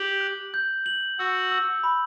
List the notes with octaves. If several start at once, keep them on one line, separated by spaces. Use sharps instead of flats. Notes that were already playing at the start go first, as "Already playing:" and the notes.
Already playing: G4 F#7
F#6
G6
F#7
F#4 E6
E6
B5